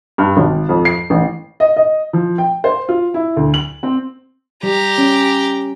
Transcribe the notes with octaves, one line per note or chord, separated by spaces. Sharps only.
G2
G#1
F2
C7
A1
D#5
D#5
F3
G5
C5
F4
E4
D2
F#7
C4
G3 G4 A#5
C#4